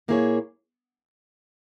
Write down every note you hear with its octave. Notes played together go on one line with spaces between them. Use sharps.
A#2 A#3 E4 G#4 C#5